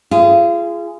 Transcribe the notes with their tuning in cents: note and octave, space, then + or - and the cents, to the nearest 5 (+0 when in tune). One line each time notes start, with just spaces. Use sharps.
F4 -35 G#4 +0